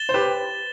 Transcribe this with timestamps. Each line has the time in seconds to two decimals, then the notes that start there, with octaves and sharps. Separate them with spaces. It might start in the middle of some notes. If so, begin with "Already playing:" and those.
Already playing: A6 E7 G7
0.09 C5
0.14 G4 B4